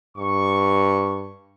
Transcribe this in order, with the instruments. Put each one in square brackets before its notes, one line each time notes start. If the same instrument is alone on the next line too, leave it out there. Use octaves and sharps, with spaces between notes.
[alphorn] G2 [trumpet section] C#6